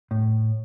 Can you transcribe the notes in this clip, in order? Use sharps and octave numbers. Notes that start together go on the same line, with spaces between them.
A2